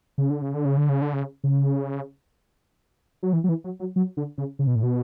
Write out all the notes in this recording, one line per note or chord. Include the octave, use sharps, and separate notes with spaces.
C#3
D3
C#3
D3
C#3
D3
C#3
D3
C#3
C#3
F#3
E3
F#3
E3
F#3
F#3
F#3
D3
C#3
C#3
B2
A2
B2